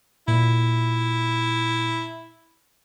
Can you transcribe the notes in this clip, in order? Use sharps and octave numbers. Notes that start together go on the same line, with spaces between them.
A#2 E4